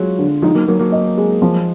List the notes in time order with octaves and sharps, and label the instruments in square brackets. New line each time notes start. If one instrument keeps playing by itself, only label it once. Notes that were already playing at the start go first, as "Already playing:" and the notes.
Already playing: [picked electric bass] F#3 [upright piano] G#3 F4
[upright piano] D3
[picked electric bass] F3 G#3 [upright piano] D#4
[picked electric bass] F#3 A#3
[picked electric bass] F#3 A#3 [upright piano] A#4
[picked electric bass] F#3 A#3
[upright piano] D#5
G#3
F3